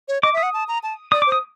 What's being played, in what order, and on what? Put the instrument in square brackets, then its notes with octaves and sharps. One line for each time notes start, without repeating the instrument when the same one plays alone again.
[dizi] C#5
[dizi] D#5 [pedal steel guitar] D6
[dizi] E5
[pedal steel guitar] D#6
[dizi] F#5
A5
A#5
A5
[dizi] D5 [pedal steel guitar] D#6
[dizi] C5 [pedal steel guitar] D6
[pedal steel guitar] D#6